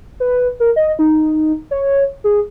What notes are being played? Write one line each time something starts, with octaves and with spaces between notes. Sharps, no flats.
B4
A#4
D#5
D#4
C#5
G#4